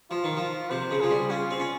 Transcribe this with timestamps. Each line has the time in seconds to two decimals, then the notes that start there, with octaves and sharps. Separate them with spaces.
0.11 F3 F4
0.24 D#3
0.37 F3
0.71 C3 C5
0.91 C#3
1.00 F3 G#4
1.10 G3
1.30 C#4 F4
1.51 C4
1.60 C#4